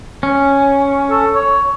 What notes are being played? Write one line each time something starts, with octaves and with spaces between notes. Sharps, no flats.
C#4
A4
C#5